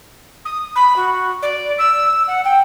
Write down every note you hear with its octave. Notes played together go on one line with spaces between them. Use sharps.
D#6
B5
F#4
D5
E6
F#5
G5